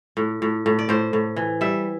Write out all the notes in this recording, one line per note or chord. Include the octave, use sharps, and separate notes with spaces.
A2
A2
A2
D5
A2 C5
A2
E3
G3 E5